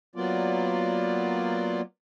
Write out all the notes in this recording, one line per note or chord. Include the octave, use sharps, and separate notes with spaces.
F#3 A#3 B3 F4 D5